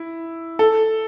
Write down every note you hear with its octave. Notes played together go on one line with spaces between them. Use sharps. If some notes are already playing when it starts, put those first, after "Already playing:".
Already playing: E4
A4